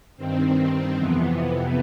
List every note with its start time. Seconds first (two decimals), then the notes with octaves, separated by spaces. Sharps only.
0.17 G2 D#3 C4
0.57 C4
0.96 F2 C3 E3 B3